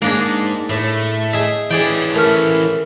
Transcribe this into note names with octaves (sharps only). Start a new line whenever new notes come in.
G#2 A#3 D4 G#4
A2 A3
G#4 D#5 E5
E3 C#4 G#4 D5 G5
A3 A#4 F6